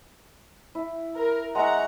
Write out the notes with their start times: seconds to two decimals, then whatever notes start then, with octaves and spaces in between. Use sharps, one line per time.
0.75 E4
1.15 A#4
1.55 G#3 E5 F#5 A#5 C#6